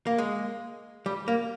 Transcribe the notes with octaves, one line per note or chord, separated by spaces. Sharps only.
A#3
G#3
G3
A#3